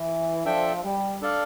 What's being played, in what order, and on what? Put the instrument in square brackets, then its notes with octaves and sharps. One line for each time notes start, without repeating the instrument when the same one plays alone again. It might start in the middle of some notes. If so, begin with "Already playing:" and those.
Already playing: [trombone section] E3
[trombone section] F3 [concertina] D4 A4 E5 G5
[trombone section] G3
[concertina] D4 A4 D5 F5